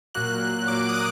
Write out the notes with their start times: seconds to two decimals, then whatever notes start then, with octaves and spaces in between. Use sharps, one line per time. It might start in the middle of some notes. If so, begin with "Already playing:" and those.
0.14 A#2 F#3 A#3 F#6
0.68 A#2 F#3 A#3 D6
0.89 D#6
0.95 D6